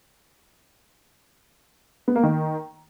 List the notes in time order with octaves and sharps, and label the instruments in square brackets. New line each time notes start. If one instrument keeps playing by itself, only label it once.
[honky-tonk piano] B3
A#3
D#3